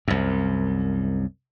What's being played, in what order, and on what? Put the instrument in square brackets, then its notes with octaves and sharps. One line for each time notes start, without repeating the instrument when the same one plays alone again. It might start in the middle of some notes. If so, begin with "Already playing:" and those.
[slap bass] C2 F#2